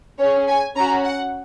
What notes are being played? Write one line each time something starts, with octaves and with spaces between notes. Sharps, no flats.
C#4 G#4 C#5
G#5
C#4 F#4 A#5
F#5